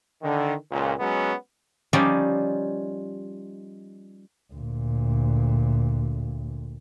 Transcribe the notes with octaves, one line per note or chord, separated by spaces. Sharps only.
D3 D#3
C#2 A#2
F#3 G#3 B3 C#4
F3 G3 C#4 D#4 D5
D2 A#2